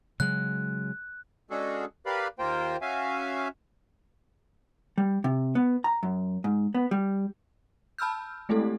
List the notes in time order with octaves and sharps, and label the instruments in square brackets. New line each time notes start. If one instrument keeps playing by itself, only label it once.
[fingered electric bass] C#3 F#3 G#3 [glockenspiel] F#6
[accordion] G#3 C#4 D4 F#4 G#4 A4
G4 A#4 B4 D5 F5 B5
D#2 A#3 F4 A#4 C5 G5
C#4 F#4 E5 F5 G#5
[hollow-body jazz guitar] G3
C3
B3
A#5
F#2
G#2
B3
G3
[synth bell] A5 B5 E6 F6 G6
G#3 A3 C4 E4 G4 A4